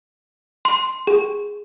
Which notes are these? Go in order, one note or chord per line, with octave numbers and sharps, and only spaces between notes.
C6
G#4